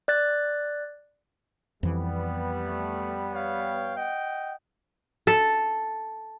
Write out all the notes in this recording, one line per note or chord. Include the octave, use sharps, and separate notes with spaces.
D5 F#6 A6
F2 E3 G3 B3
A3
C#5 F5 G5
D#5 F#5 G5
A4